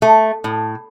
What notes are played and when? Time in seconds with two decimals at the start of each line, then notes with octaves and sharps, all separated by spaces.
0.02 A3
0.44 A2